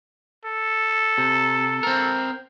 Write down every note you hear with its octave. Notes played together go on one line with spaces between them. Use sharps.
A4
C3
C4 A#4